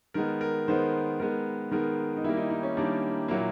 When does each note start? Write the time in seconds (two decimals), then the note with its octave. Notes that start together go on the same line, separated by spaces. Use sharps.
0.14 D#3 G#3 B3 A#4
0.41 A#4
0.68 D#3 G#3 B3 C5
1.20 D#3 G#3 B3 A#4
1.71 D#3 G#3 B3 A#4
2.17 D#4
2.24 D#3 G3 A#3 E4
2.37 D#4
2.50 D#4
2.63 C#4
2.77 D#3 G3 A#3 D4
3.28 A#2 F#3 A#3 E4